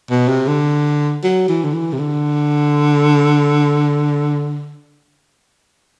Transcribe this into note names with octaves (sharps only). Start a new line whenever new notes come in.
B2
C3
D3
F#3
E3
D3
E3
C3
D3